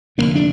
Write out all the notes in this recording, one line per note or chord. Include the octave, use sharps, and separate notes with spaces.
F1 E2 D3 A#3
D4